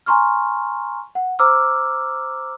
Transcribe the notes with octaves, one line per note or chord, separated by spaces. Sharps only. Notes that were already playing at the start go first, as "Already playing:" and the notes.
G#5 A#5 C6 C#6 F6
F#5
C5 A#5 D6 E6 F6